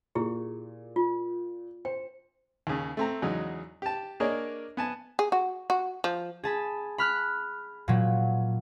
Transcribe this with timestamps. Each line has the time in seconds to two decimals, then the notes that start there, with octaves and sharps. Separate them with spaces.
0.15 A#2 E4 G4 G#4
0.96 F4
1.85 C5 G5
2.67 D#2 C#3
2.97 A3 C4 A#5
3.22 E2 C#3 F#3 G#3 D#4
3.82 G4 A5
4.20 A#3 D4 G#4 A#4 C#5 D#5
4.77 B3 G#5 A5
5.19 G#4
5.32 F#4
5.70 F#4
6.04 F3
6.43 G#4 A5 B5
6.98 B5 F6 F#6
7.88 A#2 F#3